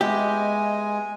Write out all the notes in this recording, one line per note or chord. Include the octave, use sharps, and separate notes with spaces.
G#3 B3 G4 D#5 E5 G#5